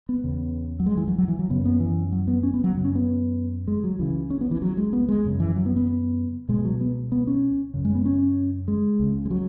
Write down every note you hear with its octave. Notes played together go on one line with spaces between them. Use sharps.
B3
E2 C#3
F#3
G#3
E3
F#3
F#3
E3
F#3
F#2 C#3 B3
B3
E3
F#3
B3
C#4
B3
F#3
F#2 C#3
C#4
B3
G#3
F#3
C#2 C#3 E3
C#4
B3
E3
F#3
G#3
B3
G#3
F#2 C#3
E3
F#3
B3
B3
C#2 B2 G#3
F#3
B3
B3
C#4
F#2 C#3
G#3
B3
C#4
G#3
C#2 C#3
G#3
F#3